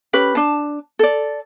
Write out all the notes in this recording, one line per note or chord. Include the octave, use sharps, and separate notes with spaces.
C#4 G4 B4 B5
D4 A5
A4 D5